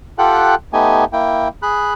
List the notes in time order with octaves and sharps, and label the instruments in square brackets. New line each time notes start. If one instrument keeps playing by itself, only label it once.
[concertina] F4 G4 A4 F#5 G5 F#6
A3 B3 D#4 G4 G#5
A#3 E4 G5
G#4 B5 F#6